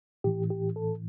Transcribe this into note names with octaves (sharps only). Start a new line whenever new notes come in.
A2 E3 G4
G4
A4